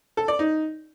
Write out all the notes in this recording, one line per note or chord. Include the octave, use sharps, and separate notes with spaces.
A4
D5
D#4